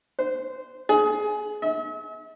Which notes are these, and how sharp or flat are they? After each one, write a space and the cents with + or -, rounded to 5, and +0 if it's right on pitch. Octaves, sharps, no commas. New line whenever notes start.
C5 -15
G#4 +20
E5 -45